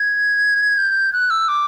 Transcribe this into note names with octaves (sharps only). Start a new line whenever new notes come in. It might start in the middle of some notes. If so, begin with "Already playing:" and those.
Already playing: G#6
G6
F#6
E6
D6